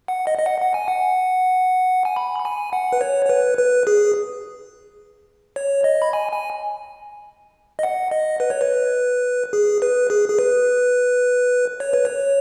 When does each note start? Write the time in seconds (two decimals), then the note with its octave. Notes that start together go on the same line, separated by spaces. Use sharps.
0.08 F#5
0.27 D#5
0.38 D#5
0.46 F#5
0.61 F#5
0.74 G#5
0.88 F#5
2.05 G#5
2.16 B5
2.39 B5
2.45 G#5
2.73 F#5
2.93 B4
3.01 C#5
3.25 C#5
3.29 B4
3.58 B4
3.87 G#4
5.56 C#5
5.84 D#5
6.02 B5
6.13 G#5
6.32 G#5
7.79 D#5
7.83 F#5
8.11 D#5
8.40 B4
8.50 C#5
8.61 B4
9.53 G#4
9.82 B4
10.10 G#4
10.29 G#4
10.39 B4
11.80 C#5
11.93 B4
12.05 C#5